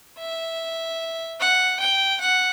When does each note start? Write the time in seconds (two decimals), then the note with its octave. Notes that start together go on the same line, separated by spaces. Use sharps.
0.18 E5
1.40 F#5
1.80 G5
2.21 F#5